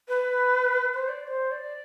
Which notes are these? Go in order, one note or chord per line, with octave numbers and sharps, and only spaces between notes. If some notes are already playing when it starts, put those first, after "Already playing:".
B4
C5
D5
D5
C5
D5